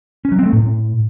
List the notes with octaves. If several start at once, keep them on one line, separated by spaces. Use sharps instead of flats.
C#4
F#3
C4
A3
A2